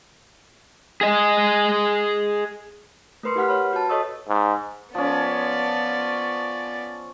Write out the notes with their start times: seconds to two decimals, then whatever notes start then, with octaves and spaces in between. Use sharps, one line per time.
1.01 G#4 D#5
3.23 A3 A#4 B4 C6 C#7
3.36 E4 G4 B4 F#5 F6 B6
3.48 B4 C#5 B5
3.73 F#4 A5
3.89 A4 C#5 D#5 C#6 D#6 E6
4.28 G#2
4.95 F3 B3 C#4 D5